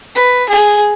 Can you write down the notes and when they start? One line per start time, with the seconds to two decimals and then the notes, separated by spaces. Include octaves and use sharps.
0.15 B4
0.49 G#4